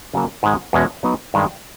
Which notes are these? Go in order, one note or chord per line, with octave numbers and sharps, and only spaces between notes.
C#3 F#3 A#3
G#2 D#3 G#3
E2 B2 G#3 C#4 F#4
F#3 B3 D#4
G2 D#3 G#3